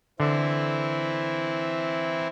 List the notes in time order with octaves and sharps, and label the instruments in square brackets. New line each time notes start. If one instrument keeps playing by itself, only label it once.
[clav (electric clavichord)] D3 [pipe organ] E3 C4 E4